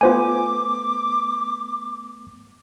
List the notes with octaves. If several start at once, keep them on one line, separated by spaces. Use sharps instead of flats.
A3 B3 F4 C5 G#5 D6